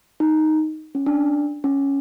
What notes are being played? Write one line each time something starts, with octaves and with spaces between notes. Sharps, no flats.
D#4
C#4
D4
C#4